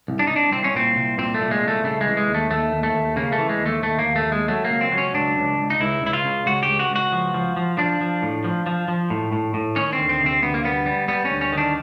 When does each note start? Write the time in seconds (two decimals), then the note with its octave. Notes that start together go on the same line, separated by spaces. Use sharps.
0.08 C2
0.19 D4
0.27 C2 D#4
0.36 D4
0.52 C2 C4
0.64 C#4
0.75 A#2 C4
0.96 C2
1.18 A#2 C4
1.34 A3
1.40 A#2
1.51 G#3
1.63 C2
1.68 A3
1.84 C#3 A3
2.01 G#3
2.06 E3
2.17 G#3
2.28 D#2
2.34 A3
2.50 D#2 A3
2.72 D#2
2.83 A3
2.94 D#2
3.16 C#3 A#3
3.32 A3
3.38 E3
3.49 G#3
3.60 D#2
3.66 A3
3.82 D#2 A3
3.99 A#3
4.04 D#2
4.16 A3
4.26 D#2
4.32 G#3
4.48 F#3 A3
4.65 A#3
4.70 C#2
4.81 C4
4.92 F#3
4.98 C#4
5.14 C#2 D4
5.37 C#2
5.58 C#2
5.70 D#4
5.80 C#2 E4
6.02 C#2 E4
6.13 F4
6.25 C#3
6.46 C#2 F#4
6.63 G4
6.69 C#2
6.79 F#4
6.90 C#2
6.96 F#4
7.12 F3
7.34 F3
7.56 F3
7.78 F3 D4
8.01 F3
8.22 A2
8.44 F3
8.66 F3
8.88 F3
9.10 A2
9.33 A2
9.54 A2
9.76 D#3 C#4
9.93 C4
9.98 D2
10.09 C4
10.20 C3
10.26 C4
10.42 D2 B3
10.54 A#3
10.65 G3 B3
10.86 G3
11.08 G3 B3
11.25 C#4
11.30 D2
11.41 C#4
11.52 D#3
11.58 D4